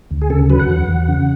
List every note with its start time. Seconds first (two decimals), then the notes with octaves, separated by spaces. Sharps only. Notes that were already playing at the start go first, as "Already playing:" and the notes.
0.11 D2
0.22 G#4
0.30 C#3 A4
0.50 F#3 B4
0.60 F#5
0.69 E2
0.88 E2
1.08 C#3